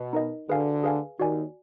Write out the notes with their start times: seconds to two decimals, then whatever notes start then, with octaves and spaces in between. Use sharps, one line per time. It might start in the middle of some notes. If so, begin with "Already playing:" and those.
Already playing: B2
0.13 D#4 A#4 D#5
0.49 D2 D3 G#4 B4 F5 G#5
0.83 G#4 B4 F5 G#5
1.19 D#2 D#3 F#4 D5 G#5